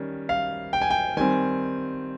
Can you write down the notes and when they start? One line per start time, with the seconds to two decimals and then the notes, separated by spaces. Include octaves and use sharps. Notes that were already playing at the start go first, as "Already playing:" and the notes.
Already playing: D#3 G3 C#4
0.29 F5
0.73 G5
0.82 G#5
0.90 G5
1.17 D#3 G3 C4 G#5